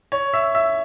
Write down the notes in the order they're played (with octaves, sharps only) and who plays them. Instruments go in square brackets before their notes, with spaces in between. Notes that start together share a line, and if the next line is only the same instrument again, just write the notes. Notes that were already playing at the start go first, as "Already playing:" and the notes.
[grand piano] C#5
E5
E5